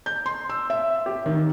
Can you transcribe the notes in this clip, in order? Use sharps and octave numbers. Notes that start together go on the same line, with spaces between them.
G6
C6
E6
E5
G4
D#3